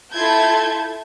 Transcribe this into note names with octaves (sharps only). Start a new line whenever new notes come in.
E4 F4 A4 A5 G6 G#6